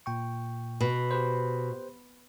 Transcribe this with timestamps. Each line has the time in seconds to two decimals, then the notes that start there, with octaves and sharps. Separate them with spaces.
0.06 A#2 G5 C#6
0.81 B2
1.11 G4 B4 C5